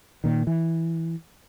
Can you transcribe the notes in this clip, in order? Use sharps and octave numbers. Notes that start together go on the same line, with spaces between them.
A#2 D#3
E3